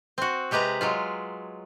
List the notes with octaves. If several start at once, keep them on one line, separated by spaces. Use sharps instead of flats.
C4 F#4
C3 G#3 G4 B4 A#5
F#3 G#3 F4